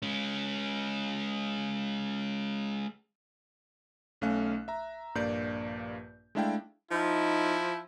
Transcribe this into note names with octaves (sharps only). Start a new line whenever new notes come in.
G#3 C#4
B1 A3 C#4 F5 F#6
E5 A#5
A#1 G2 A#3 D5 G6
G#3 A3 D4 E4 F5 G5
F3 D#4 E4